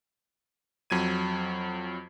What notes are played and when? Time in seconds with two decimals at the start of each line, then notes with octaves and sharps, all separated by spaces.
0.90 F2 F#3 G#6 D#7